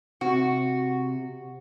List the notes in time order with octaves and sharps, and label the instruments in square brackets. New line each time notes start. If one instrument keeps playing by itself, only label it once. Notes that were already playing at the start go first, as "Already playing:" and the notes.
[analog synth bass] C3 [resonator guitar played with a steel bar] F#4